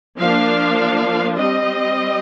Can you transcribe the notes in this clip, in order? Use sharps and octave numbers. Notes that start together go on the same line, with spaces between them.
F3 A#3 D4 F5
G3 C4 D#5